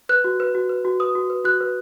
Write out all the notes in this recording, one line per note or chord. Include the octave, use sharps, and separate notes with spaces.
B4 F#6
F#4
B4
F#4
B4
F#4
B4 D#6
F#4
B4
F#4 F#6
B4